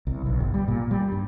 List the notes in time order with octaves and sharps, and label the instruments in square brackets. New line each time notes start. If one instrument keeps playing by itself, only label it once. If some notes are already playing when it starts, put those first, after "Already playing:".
[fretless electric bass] C2
B1
G1
G3
A#2
G3
G2